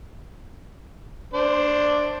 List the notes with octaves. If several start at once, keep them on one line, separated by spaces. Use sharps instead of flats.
D4 C5